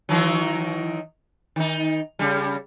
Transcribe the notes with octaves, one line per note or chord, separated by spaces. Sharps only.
D#3 E3 F#3
D#3 D#4
C#3 G3